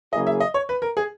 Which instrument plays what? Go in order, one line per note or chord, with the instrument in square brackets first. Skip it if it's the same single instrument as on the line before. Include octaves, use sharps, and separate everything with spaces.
[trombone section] C#3 F#3 A#3 E4 G#4 [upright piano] D#5
[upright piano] E5
D#5
C#5
B4
A#4
G#4